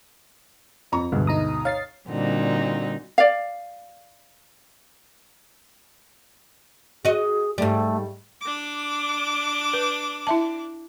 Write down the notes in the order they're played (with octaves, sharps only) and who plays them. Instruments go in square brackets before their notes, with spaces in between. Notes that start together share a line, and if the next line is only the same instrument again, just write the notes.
[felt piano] F2 A#5 C#6
[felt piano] D2 B2 G#3 [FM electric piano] G2
[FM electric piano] D#4 A#5 D#6
[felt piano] C#5 [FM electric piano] F5 A6 C7
[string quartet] A#2 D3 G3 C4 D#4 F#4
[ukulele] D5 F5
[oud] F#4 D#5 [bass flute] G#4
[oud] G#2 G3 [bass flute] A3
[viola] D4 D6
[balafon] B4
E4 E5 A5